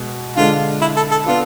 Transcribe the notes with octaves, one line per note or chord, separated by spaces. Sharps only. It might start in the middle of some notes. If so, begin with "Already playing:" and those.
Already playing: B2 G#3 B3
D3 G#3 D4 F4
E4
A4
A4
B3 D4 F4